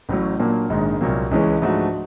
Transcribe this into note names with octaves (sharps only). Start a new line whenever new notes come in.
A1 A2 F#3
A#2 F#3 A#3 D4
A#1 G#2 D#3 G#3
C2 A#2 F#3 A#3
C#2 C#3 E3 G#3 C#4
G#2 F3 A3 D4 F#4